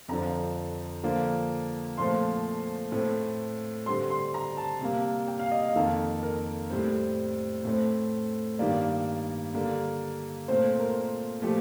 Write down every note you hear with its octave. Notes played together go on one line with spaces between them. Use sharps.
F2 D3 F3 A#5
D3 F3 A#3
A#2 F3 A3 C4 C6
A2 A3 C4
D3 G3 C4 C6
C6
A#5
A5
C3 G3 A#3
G5
F5
D#5
F5
F2 D#3 A#3 A4
A#4
A2 G3 C4 C5
A2 A3 C4
G2 D#3 G3 A#3 D5
D3 G3 A#3
A#2 A3 C4 C5
A#4
A#2 F3 A3 G4